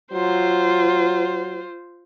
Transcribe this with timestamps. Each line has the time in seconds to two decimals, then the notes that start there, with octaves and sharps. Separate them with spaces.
0.12 F#3 F4 C5